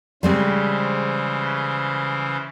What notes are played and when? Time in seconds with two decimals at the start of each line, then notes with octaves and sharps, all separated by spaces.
0.23 C#3 E3 G3 G#3 C4 C5